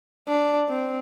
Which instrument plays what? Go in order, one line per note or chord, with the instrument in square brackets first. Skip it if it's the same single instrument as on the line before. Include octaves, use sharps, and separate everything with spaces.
[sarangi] D4
C4